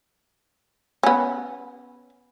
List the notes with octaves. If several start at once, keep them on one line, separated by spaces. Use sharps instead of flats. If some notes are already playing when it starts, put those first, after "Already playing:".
B3 C#4